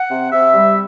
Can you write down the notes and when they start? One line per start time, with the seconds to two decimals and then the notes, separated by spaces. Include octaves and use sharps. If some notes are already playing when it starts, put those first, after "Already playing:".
Already playing: F#5
0.09 C3
0.32 C3 E5
0.53 G3